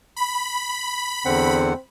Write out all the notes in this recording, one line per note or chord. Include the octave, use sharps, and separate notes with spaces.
B5
E2 D3 C4 F#5